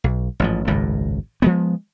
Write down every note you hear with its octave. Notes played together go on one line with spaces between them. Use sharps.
B1
A1 G#2 F3
G#1 C#2 F#2 A2
F3 G#3 B3